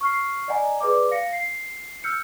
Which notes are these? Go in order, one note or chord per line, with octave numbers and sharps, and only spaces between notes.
C#6 F6 C7
D5 D#5 F#5 G#5 A#5
G#4 B4 D5 D6
F5 A#6 C#7
C7
E6 F6 G6 C#7